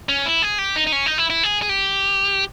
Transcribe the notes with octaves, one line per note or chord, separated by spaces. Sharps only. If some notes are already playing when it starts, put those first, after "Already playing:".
C#4
E4
G#4
G4
D#4
D#4
C#4
D#4
E4
E4
G#4
G#4
G4